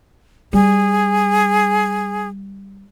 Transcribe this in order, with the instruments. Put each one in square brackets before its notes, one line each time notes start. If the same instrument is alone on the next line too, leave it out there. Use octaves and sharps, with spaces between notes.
[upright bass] G3 [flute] G#4